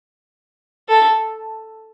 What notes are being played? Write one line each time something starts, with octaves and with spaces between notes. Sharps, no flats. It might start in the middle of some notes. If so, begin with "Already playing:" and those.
A4